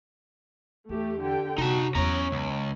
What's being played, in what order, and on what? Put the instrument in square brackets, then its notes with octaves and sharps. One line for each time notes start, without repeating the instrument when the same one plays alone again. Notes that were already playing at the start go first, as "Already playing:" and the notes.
[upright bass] E2 [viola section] A3 G4
[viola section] D3 G4 G5
[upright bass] F#2 C3 [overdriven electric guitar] D#4 A5 [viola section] F#4
[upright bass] E2 F#3 [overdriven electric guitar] C#4 A#5 [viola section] C#5
[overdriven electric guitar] C#2